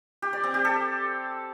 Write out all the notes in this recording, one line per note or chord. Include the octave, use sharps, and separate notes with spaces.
G4
D5
C4
G4
A4